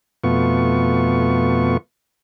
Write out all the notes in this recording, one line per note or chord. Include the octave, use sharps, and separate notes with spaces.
F2 B2 A3 B3 F4 C#6